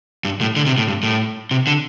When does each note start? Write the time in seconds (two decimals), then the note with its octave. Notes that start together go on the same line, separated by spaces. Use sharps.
0.24 G2
0.41 A2
0.56 D3
0.66 C3
0.78 A2
0.88 G2
1.03 A2
1.51 C3
1.67 D3